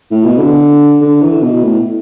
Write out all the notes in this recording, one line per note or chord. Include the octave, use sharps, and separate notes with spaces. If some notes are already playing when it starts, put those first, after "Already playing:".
A2
B2
D3
D3
E3
B2
A2